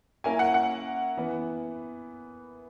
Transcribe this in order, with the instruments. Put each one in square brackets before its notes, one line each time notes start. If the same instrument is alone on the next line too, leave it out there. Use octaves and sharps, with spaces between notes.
[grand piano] A#3 C#4 E4 A#4 [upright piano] G#5
[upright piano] F#5
F#5
[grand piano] E3 B3